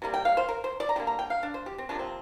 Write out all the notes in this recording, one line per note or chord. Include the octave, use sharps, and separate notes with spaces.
C3 G3 A#3
G5
F5
C5
A#4
C5
D5
A#5
D3 G3 A#3 G5
A#5
G5
F5
D4
C5
G4
C4
C3 F3 A#3 D4
C4